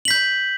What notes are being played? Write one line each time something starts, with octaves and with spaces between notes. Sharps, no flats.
G6 B6 F#7